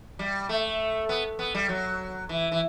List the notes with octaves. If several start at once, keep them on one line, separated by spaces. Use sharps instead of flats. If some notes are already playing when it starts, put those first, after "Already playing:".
G3
A3
B3
B3
G3
F#3
E3
E3